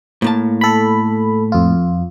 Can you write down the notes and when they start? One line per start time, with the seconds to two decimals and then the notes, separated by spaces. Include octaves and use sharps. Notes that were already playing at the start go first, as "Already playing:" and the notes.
0.22 A2 A#3 A5
0.61 A4 B5
1.52 F2 F4